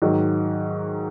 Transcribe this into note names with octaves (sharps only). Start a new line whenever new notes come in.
G#2 D#3 F#3